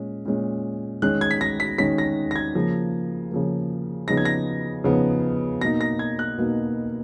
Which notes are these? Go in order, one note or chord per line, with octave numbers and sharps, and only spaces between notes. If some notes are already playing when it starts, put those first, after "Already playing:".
Already playing: A#2 G#3 C#4
A#2 G#3 C#4
D#3 G#3 C#4 F#6
G#6
B6
A#6
B6
D#3 G#3 C#4 B6
A#6
A#6
G#6
C#3 F3 A#3
C#3 F3 A#3
C#3 F3 B3 D#4 A#6
G#6
A#6
C#3 F3 B3 D#4
B2 A#3 D#4 A#6
A#6
G#6
F#6
B2 A#3 D#4